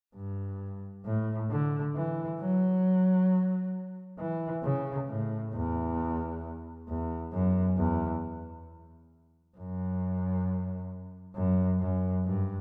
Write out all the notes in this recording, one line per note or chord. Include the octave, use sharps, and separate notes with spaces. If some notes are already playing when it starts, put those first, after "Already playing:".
G2
A2
D3
E3
F#3
E3
C#3
A2
E2
E2
F#2
E2
F#2
F#2
F#2
G2